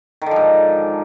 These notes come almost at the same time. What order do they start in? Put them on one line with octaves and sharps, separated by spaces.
D#3 D3 F3 G#2